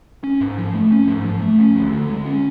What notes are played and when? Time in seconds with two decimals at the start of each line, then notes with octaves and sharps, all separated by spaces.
0.24 C#4
0.41 G#2
0.58 F3
0.74 A3
0.92 C#4
1.08 G#2
1.24 F3
1.42 A3
1.59 C#4
1.76 D2
1.92 D3
2.09 G#3
2.26 C#4